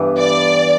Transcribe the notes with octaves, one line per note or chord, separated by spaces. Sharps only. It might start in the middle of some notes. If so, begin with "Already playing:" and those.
Already playing: G2 E3 B3 D4
D5